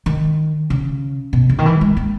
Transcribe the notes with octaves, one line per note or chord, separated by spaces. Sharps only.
D#3
C#3
B2
C#3
D#3
E3
G#3
A#3